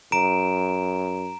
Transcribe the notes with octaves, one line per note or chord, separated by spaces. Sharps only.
F#2 A#5 D7 E7